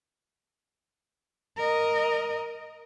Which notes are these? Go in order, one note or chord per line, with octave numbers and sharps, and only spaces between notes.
A#4 D#5